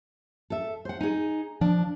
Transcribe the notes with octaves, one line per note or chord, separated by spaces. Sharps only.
A4 E5
C5 F#5
D#4 G#4
F3 D4